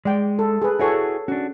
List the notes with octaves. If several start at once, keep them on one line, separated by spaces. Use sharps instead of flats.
G#3 D5 G5
A4
G#4 B4
E4 F#4 G#4 A4 C#5 G#5
C#4 D4 F#4